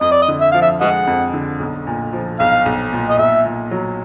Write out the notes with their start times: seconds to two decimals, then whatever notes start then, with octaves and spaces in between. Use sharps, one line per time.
0.01 F2 D#5
0.11 D5
0.22 D#5
0.28 D3
0.41 E5
0.52 F3 F5
0.62 E5
0.81 G#3 D#5 F#5
1.07 F2
1.33 D3
1.60 B1
1.87 A#2
2.13 F3
2.40 B1 F5
2.66 B1
2.93 A#2
3.10 D#5
3.19 B1 E5
3.45 A#2
3.71 F#3